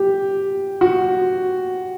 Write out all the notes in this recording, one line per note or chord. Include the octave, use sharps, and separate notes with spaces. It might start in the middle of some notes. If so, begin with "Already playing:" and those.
Already playing: G4
F#4